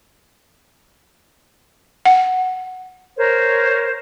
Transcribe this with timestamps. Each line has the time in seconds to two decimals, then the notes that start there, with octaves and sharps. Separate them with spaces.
2.05 F#5
3.15 A#4 C5 C#5